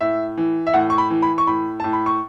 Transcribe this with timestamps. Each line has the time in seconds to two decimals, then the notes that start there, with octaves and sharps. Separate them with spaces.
0.01 A2 E5
0.38 E3
0.67 E5
0.74 A2 F#5
0.90 C#6
0.98 B5
1.10 E3
1.22 B5
1.38 C#6
1.47 A2 B5
1.80 A2 A5
1.93 B5
2.06 C#6